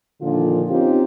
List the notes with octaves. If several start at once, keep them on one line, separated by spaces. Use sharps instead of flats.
A#2 D3 D#3 F3 F4
C4 C#4 D#4 F4 G4